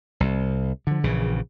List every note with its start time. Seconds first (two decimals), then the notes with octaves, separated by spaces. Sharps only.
0.20 C2
0.87 D3 F3
1.03 A#1 C#3 E3